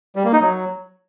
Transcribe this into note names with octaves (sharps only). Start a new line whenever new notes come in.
G3
A#3
D#4
F#3